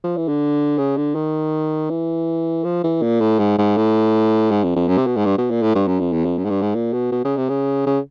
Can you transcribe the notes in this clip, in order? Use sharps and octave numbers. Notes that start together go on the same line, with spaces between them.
F3
E3
D3
C#3
D3
D#3
E3
F3
E3
A#2
A2
G#2
G#2
A2
G#2
F2
F2
F#2
C3
B2
G#2
G2
B2
A#2
A2
G2
F#2
F2
E2
F2
F#2
G#2
G2
G#2
A#2
B2
B2
C#3
C3
C#3
C#3